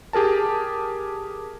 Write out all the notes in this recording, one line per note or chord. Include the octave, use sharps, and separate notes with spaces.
G4 G#4 A#4 A5